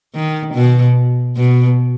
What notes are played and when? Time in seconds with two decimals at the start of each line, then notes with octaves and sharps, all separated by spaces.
0.15 D#3
0.54 B2
1.37 B2